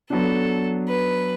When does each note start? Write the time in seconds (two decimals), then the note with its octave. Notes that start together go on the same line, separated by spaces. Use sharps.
0.10 F#3 B3 D4 A4
0.89 B4